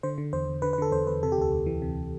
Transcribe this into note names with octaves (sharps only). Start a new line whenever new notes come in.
D3 C5
D3
E2 C5
E2
D3 B4
B4
D3 A4
E2 C5
E2 B4
C3 A4
G4
D2 A4
D2
E3
C3